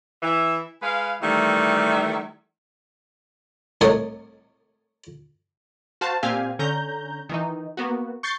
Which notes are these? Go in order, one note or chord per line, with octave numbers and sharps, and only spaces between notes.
E3 E5
G#3 B4 F5
D#3 E3 G3 A3
C2 A2 A#4 C#5 D#5 A5
F#4 C5 F5 A5
A#2 C4 G4 F5 G#5
D3 C#4 A#5 G6
D#3 E3 D#4
A#3 B3 F#4
C#6 G6 A6 C7